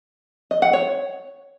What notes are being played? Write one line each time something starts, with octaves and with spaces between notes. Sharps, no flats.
D#5
F#5
C#5